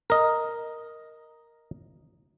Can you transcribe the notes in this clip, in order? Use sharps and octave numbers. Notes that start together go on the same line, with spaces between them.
A#4 D#5